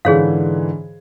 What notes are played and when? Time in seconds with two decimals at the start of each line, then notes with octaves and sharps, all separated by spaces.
0.05 G#2 D3 E3 G#4 C#5 F5